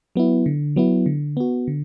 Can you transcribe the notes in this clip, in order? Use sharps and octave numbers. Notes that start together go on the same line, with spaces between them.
F#3 B3 E4
D3
F#3 B3 E4
D3
B3 F#4
D3